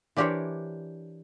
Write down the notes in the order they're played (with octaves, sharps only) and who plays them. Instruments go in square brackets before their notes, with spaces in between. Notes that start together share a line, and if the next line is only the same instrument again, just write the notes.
[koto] E3 D4 G4 A#4 C5 C#5